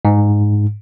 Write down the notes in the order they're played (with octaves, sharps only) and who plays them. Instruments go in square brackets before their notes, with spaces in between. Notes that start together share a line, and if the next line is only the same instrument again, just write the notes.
[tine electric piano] G#2